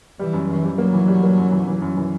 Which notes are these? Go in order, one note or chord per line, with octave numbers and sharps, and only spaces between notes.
E3 G3
F#2
F#2 E3
G3
F#3 A#3
E3
G3
A#3
F#2
E3
E3
F#2
E3